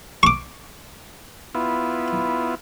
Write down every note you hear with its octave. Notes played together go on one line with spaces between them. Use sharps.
C#6 D6
B3 E4 F4